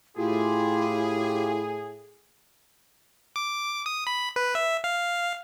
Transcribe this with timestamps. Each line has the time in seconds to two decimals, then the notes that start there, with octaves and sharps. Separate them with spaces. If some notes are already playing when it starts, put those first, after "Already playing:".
0.17 A2 E4 F4 G4 G#4
3.36 D6
3.86 D#6
4.07 B5
4.36 B4
4.55 E5
4.84 F5